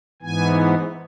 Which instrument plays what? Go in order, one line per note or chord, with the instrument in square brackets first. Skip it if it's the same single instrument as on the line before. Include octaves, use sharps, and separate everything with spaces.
[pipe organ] G#2 E3 B3 G#5